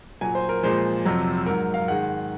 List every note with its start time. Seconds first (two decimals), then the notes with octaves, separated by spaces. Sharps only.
0.21 A#2 F#3 G#5
0.35 C5
0.49 A#4
0.63 A#2 F3 G#3 C5
1.05 F2 C3 F#3
1.46 G#2 F#3 A#4
1.74 F5
1.88 G#2 D#3 G#3 F#5